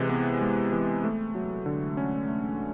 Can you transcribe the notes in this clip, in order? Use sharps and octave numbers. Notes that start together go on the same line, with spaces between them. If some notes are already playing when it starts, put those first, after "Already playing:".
Already playing: C3 E3 G#3
B3
G#3
E3
A3
F#3
D3
C#4
A3